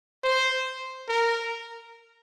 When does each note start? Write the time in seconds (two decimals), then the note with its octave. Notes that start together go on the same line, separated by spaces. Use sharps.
0.24 C5
1.09 A#4